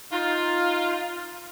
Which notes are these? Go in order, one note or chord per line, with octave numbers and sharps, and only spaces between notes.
D#4 F4